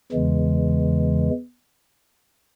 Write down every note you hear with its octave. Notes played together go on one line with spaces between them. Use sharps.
E2 C#3 E3 G#3